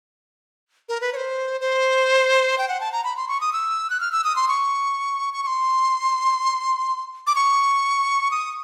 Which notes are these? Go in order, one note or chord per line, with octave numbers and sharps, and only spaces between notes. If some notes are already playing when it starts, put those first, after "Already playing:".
A#4
B4
C#5
C5
C5
G5
F#5
A5
A#5
B5
C6
C#6
D#6
E6
F#6
F6
E6
D#6
C6
C#6
C#6
C#6
C6
D6
C#6
D#6